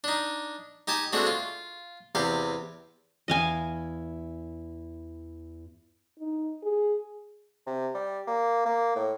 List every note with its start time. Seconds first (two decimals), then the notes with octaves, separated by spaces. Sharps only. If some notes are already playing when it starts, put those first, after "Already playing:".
0.04 D4 D#4
0.87 D#4 G4 G#5 A5
1.13 G#3 A3 C4 D4 F#4
1.27 F4
2.15 E2 C3 G4 F5
3.28 E2 E4 D#5 F5 G#5
6.19 D#4
6.63 G#4
7.67 C3
7.95 G3
8.27 A#3
8.66 A#3
8.96 A2